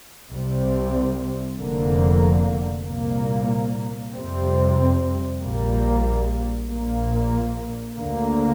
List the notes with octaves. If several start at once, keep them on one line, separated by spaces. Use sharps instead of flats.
C2 C3 G3 C4
F1 F2 D3 A#3
C2 A#2 A#3
F2 C3 G3 C4
A#1 A#2 G3 A#3
A#1 A#2 A#3
D2 D3 A#3